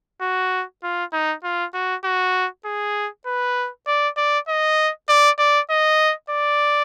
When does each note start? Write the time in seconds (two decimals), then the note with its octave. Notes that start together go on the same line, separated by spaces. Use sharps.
0.21 F#4
0.83 F4
1.13 D#4
1.44 F4
1.74 F#4
2.04 F#4
2.65 G#4
3.26 B4
3.87 D5
4.17 D5
4.48 D#5
5.09 D5
5.39 D5
5.70 D#5
6.30 D5